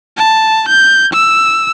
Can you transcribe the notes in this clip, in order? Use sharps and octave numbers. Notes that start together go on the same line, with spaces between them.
A5
G6
E6